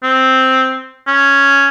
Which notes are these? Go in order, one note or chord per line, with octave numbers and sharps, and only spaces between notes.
C4
C#4